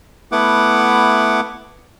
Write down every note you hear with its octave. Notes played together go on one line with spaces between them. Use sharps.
A3 B3 E4 F#5 D6